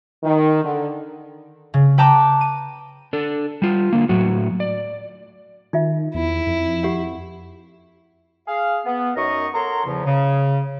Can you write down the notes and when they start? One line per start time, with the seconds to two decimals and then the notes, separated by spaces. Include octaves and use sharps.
0.24 D#3
0.64 D3
1.74 C#3
1.98 B4 G5 A5 A#5 D6
2.41 D#7
3.13 D4 A4
3.62 G3 F4
3.93 D3 A#3
4.09 A2 F#3 F#4
4.60 D5
5.73 D#3 D#4 F4 E5
6.15 E2 E4
6.47 F2
6.83 G4 F#5
8.47 G#4 F5
8.85 B3
9.16 F#2 F#3 D#4 A#4 D#5 C#6
9.54 A4 A#4 C#5 F#5 A#5 C6
9.85 E2 C#3 F3
10.04 C#3